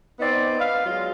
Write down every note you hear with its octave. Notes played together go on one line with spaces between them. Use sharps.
B3 C4 D#4 D5
B4 F5
F#3 G#3 F4